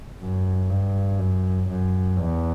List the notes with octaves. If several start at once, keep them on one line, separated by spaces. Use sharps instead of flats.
F#2
G2
F#2
F#2
E2